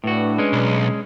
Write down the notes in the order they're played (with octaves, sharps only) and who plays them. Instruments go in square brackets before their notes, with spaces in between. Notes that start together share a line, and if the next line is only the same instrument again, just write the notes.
[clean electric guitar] A2 F#4 [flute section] D4 B4
[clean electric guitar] G#3 C#4
[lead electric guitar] B1